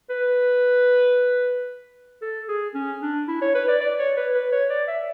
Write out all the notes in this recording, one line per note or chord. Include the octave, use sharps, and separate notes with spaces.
B4
A4
G#4
C#4
D4
E4
C#5
B4
D5
D5
C#5
B4
B4
C#5
D5
E5